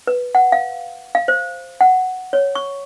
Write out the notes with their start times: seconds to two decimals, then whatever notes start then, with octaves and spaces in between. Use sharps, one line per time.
0.07 B4
0.35 F#5
0.52 F5
1.15 F5
1.28 C5
1.81 F#5
2.33 C#5
2.55 C#6